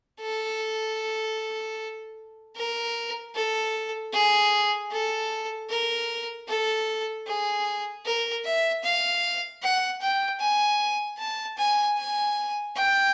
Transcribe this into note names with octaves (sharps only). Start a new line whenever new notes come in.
A4
A#4
A4
G#4
A4
A#4
A4
G#4
A#4
E5
F5
F#5
G5
G#5
A5
G#5
G#5
G5